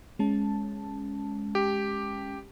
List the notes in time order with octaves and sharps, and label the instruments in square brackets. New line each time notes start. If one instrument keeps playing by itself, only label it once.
[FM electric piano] G#3 C#4 A5
[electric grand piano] G4